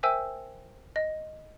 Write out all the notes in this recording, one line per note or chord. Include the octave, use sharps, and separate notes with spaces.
A#4 C5 E5 G5 G#5 E6
D#5